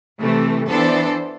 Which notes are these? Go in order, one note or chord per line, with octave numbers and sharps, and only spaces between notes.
C3 E3 A3
E3 B3 D4 A4 C5